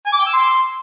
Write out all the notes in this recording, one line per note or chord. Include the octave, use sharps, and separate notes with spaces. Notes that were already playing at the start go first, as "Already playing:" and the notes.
G#5
D6
G5
E6
C6